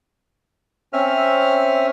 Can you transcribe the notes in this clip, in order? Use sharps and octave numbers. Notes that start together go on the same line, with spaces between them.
C4 C#4 E5 F6